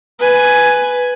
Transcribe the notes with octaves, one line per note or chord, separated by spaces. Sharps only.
B4 G#5